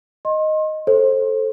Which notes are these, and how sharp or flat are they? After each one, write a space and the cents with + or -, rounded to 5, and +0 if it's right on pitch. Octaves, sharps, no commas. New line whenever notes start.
D#5 +0 C6 +35
A4 +0 C5 +20